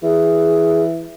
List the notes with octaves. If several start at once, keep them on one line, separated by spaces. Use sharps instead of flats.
E3 G#4